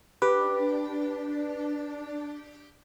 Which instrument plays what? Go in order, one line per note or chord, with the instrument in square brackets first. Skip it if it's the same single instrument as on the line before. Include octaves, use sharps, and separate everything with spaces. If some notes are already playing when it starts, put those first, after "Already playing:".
[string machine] D4 [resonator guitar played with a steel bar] G4 [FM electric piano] B4